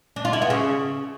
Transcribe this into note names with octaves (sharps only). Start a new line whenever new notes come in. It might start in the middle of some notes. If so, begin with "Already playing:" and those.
D4
F4
E4
B3
C#3